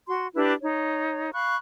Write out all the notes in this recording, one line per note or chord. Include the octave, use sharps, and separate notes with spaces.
F#4 C6
D4 E4 G4 B4
D#4 C#5
F5 B5 C#6 F#6